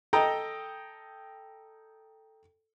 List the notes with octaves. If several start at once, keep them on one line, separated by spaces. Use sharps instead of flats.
A4 D#5 G5 A#5